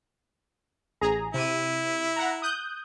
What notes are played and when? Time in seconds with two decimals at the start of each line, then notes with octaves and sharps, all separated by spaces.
1.01 A1 G#4 A#5
1.34 C3 E4 D#7
2.16 F#5 A#5
2.42 D#6 F#6 G6